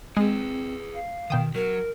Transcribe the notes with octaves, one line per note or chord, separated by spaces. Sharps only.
G#3 C4 G#4 B4
F5
B2 D#3 G5 D#6
F#3 A#4